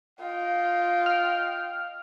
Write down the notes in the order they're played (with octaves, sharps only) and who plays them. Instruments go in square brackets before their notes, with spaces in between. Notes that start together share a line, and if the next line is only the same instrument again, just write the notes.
[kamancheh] F4 [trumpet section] D#5 G5
[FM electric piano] F6